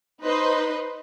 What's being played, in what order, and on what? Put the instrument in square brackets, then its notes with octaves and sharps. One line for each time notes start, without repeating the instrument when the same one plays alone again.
[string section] D#4 B4 C5 D#5 C6